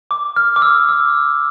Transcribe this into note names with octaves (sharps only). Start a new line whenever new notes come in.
D6
F6
D6
E6
E6